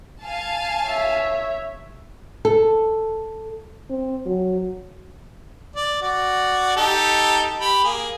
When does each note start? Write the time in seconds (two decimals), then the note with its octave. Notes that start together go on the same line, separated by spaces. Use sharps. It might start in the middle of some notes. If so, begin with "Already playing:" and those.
0.23 F5 G#5 A5
0.87 C#5 E5
2.45 A4
3.90 C4
4.26 F#3
5.76 D5
6.02 F#4 D5
6.76 D#4 G4 A4
7.60 G4 B5
7.83 A#3 G#4